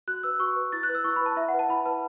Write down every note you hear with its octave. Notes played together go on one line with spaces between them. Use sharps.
F#4 F#6
B4 E6
F#4 C#6
B4
E4 A6
F#6
B4
E6
E4 C#6
B5
B4 A5
E4 E5
F#5
B4
A5
E4 B5
B4 A5